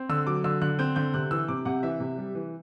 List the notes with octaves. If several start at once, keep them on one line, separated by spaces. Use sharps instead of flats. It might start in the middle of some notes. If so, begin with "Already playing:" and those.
Already playing: C4
D3 E6
F#3 D6
D3 E6
D3 F#6
C4 G6
D3 G6
C3 F#6
E3 E6
C3 D6
C3 F#5
E3 E5
C3
G3
E3